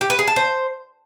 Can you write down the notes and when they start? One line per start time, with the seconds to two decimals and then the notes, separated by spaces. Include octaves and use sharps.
0.01 G4
0.10 B4
0.19 G#4
0.27 A5
0.36 C5